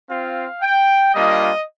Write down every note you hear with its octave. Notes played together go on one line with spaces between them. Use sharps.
C4 F4 F5
G5
G3 A#3 D4 F4 D#5